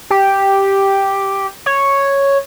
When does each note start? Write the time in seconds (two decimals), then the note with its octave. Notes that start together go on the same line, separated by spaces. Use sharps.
0.10 G4
1.66 C#5